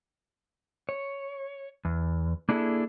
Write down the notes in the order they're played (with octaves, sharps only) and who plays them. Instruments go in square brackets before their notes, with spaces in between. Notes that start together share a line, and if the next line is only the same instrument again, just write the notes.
[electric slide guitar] C#5
E2
A#3 D4 E4 G#4 A4